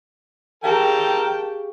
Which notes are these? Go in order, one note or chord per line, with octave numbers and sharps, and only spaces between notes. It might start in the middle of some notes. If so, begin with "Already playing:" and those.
G4 G#4 A#4 F5 G5 A5